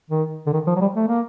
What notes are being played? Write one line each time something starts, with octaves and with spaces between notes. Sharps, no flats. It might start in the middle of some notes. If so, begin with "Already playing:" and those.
D#3
D3
D#3
F3
F#3
G3
A3
A#3